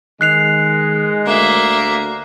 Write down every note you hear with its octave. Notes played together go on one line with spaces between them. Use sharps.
D#3 G#3 F#6 C7 F7
D2 A#3 E5